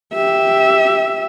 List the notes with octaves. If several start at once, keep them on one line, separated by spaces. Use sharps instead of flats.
G4 E5